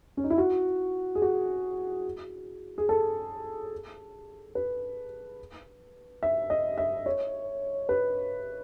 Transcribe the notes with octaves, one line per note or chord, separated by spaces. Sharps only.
C#4
D#4
E4
F#4
G#4
F#4
G#4
A4
B4
E5
D#5
E5
C#5
B4